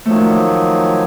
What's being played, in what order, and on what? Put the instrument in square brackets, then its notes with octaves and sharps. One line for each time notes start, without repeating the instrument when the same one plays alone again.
[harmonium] D#3 F3 F#3 [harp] A3